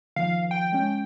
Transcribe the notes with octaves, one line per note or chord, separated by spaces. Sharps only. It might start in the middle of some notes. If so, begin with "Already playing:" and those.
D#3 F3 F5
G5
G#3 C#4